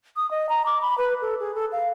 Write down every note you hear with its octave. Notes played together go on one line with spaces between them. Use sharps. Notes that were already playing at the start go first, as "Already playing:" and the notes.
D#6
D#5
A#5
D6
B5
B4
A4
G#4
A4
F5